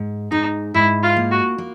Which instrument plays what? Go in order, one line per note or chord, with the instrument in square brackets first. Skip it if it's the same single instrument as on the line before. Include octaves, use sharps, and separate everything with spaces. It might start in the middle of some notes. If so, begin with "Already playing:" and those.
Already playing: [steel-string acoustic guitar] G#2
[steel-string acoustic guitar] G#2 [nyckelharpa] D#4
[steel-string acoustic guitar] G#2 [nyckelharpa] E4
[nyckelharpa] F4
[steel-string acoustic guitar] A#3
[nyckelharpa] F#4
[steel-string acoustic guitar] A#3